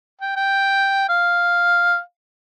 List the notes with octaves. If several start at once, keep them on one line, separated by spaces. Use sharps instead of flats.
G5
G5
F5